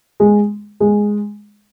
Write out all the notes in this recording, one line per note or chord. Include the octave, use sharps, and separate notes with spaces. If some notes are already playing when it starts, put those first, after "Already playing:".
G#3
G#3